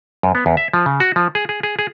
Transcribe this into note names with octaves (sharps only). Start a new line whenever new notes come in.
F#2
B3
E2
E5
F3
C#3
F#4
F3
G#4
G#4
G#4
G#4